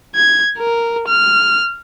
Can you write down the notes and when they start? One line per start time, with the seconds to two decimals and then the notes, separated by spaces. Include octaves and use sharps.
0.15 G#6
0.59 A#4
1.08 F6